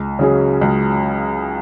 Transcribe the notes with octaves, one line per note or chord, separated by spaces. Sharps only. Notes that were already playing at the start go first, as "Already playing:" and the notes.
Already playing: C#2
C#3 F#3 C#4 G#4
C#2